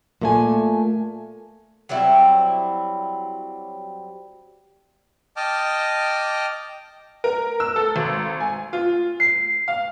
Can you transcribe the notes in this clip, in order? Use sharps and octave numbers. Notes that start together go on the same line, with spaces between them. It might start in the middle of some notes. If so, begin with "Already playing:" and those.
A#2 A3 G#5
F#3 G3 C4 E4
D#5 G5 A5 D6 F6
A#4
E6
A4
G#1
G#5
F4
C7
F5